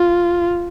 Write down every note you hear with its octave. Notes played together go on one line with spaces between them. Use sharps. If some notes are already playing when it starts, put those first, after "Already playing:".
Already playing: F4